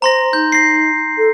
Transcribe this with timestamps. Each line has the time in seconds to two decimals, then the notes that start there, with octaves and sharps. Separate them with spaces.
0.02 C5 A#5 C6 A#6
0.33 D#4 G6
0.52 A#6 C7
1.18 A4